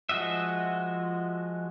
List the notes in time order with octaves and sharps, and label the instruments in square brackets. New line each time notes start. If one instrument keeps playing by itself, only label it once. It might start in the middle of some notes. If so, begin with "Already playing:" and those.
[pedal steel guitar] F3 G#3 F#4 D#5 E5